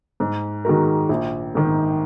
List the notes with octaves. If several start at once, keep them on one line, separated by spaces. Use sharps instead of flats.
G#2
D#3 G#3 F#4 A#4
A#1
G#2 D#3